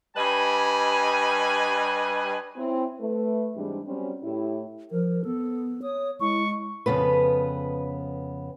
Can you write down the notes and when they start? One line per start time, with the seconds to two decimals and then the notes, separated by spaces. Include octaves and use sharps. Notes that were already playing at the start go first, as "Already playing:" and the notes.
0.17 G2 G3 B4 D#5 G#5
2.57 C4 C#4 E4
3.00 A3 B4
3.55 G#2 E3 G3 G#3 C4 D4
3.87 F#3 G3 C4 C#4
4.22 A2 E4 G4
4.91 F3 A#4
5.25 B3 A4
5.82 C#5 D#6
6.21 G#3 E4 C#6
6.86 F2 C#3 B3 B4